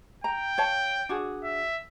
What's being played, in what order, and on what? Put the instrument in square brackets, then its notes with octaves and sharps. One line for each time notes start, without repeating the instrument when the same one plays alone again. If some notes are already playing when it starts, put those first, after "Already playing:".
[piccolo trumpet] G5 [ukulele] A#5
[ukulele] C#5 F5 A5
D4 F#4 G#4
[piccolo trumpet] E5